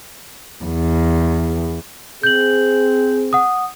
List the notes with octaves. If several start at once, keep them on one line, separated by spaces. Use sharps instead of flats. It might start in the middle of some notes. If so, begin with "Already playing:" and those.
E2
C4 G#4 G6 F#7
F#5 D#6